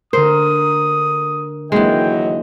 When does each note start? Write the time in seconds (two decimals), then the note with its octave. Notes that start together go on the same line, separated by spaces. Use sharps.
0.13 D3 A#4 C5 D#6
1.72 D#2 E3 F#3 G#3 A#3 D4 D#5 G5